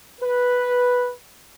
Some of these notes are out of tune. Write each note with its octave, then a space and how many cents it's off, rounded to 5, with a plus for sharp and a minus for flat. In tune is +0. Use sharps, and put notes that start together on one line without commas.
B4 -5